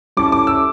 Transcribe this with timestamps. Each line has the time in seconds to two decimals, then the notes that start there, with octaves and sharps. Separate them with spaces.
0.17 G3 C#4 E4 A4 D6
0.32 D6
0.47 E6